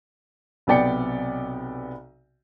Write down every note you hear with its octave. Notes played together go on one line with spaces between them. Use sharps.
B1 C3 B3 D5 G5 C#7